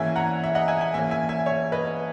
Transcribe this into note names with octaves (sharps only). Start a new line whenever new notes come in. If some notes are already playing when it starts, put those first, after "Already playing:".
Already playing: G#2 E3 A#3 C#4 E5 G#5
F#5 A#5
E5
D#5 F#5
E5 G#5
E5 G#5
G#2 E3 A#3 C#4 E5 G#5
E5 G#5
E5 G#5
C#5 E5
B4 D#5